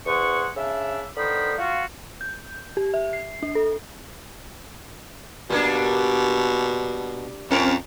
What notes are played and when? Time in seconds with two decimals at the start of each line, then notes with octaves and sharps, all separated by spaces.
0.06 E2 G#4 C5 F#5 C#6
0.57 C#3 D4 E5
1.17 D3 D#3 B3 C5 B5
1.59 F4 F#4
2.21 G6
2.77 G4
2.94 E5
3.13 C7
3.43 D4
3.55 A4
5.50 B2 G3 A#3 D4
7.51 F2 C4 C#4 A#4